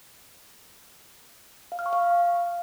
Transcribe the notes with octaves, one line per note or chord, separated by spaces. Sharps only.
F5
F6
C#6
F5